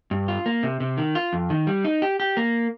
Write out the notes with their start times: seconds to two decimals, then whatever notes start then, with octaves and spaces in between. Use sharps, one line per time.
0.11 G2
0.28 F4
0.46 A#3
0.63 C3
0.80 C3
0.97 D#3
1.15 F4
1.33 F2
1.50 D#3
1.67 G3
1.84 D#4
2.02 G4
2.20 G4
2.37 A#3